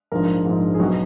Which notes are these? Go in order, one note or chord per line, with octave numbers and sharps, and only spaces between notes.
A#1 G#2 F3 A#4
A#1 G#2 F3
G#4
B1 B2 F#3 F#4